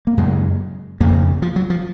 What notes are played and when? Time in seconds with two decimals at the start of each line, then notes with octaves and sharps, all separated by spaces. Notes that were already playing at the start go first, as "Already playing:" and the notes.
0.07 A#3
0.17 F#2 C#3 G#3
1.00 F2 C#3 A#3
1.42 F3
1.56 F#3
1.70 F3